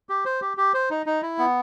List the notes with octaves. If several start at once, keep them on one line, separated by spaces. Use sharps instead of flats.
G4
C5
G4
G4
C5
D#4
D#4
E4
B3